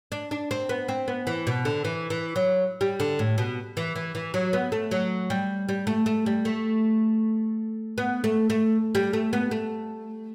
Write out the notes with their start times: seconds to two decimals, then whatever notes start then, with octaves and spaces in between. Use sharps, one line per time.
0.12 D4
0.31 D4
0.51 C4
0.69 B3
0.88 C4
1.08 B3
1.27 E3
1.47 B2
1.65 D3
1.85 E3
2.10 E3
2.36 F#3
2.81 G3
3.00 D3
3.19 A2
3.38 B2
3.77 E3
3.96 E3
4.15 E3
4.34 F#3
4.53 B3
4.72 A3
4.91 F#3
5.30 G3
5.69 G3
5.87 A3
6.06 A3
6.26 G3
6.45 A3
7.98 B3
8.24 A3
8.50 A3
8.95 G3
9.13 A3
9.33 B3
9.51 A3